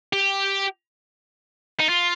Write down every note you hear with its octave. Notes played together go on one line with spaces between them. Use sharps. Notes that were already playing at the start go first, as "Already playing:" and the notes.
G4
D#4
F4